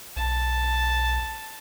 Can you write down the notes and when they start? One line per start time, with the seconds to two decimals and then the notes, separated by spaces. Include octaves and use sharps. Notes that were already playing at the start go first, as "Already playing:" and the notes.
0.16 B1 A5